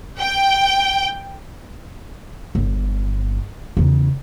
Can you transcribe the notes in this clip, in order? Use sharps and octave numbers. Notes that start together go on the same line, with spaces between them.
G5
G1
E2 C#3